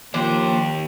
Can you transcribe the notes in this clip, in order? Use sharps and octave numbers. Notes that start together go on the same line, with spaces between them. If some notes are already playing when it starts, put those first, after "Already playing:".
D#2 F3 A#3 D4 G4 C5